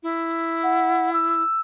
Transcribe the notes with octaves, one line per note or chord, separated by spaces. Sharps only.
E4
F#5
E6